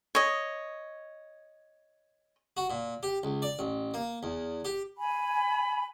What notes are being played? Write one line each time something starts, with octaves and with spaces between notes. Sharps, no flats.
C#5 D#5
F#4
A#2
G4
C#2
D5
A1
A#3
E2
G4
G#5 B5